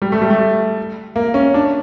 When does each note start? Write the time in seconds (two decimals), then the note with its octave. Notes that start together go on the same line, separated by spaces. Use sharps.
0.02 G3
0.12 A3
0.22 G3
0.30 A3
1.16 A#3
1.34 C#4
1.54 D4